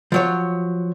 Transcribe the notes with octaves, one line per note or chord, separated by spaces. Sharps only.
F3 F#3 C#5